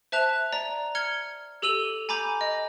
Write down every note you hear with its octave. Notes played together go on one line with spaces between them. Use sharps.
C5 E5 A5 F#6 F7
D5 A#5
F6 G#6 C#7 G7
G4 A4 E6 D#7 F7 G7
G#5 A#5 B5 D6 G6
D#5